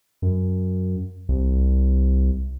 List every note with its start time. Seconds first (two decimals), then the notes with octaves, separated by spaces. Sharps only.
0.22 F#2
1.29 C2